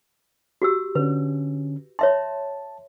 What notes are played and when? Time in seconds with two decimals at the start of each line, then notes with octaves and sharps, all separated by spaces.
0.62 F#4 G4 E6
0.95 D3 C#4 B4
1.99 C#5 E5 A5 C6